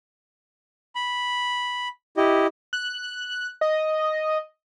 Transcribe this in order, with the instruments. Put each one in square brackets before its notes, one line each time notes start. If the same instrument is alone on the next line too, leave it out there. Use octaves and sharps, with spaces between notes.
[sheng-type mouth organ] B5
E4 G4 D#5
[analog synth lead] F#6
D#5